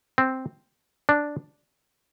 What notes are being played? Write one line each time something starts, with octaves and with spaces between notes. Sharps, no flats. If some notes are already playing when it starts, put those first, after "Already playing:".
C4
D4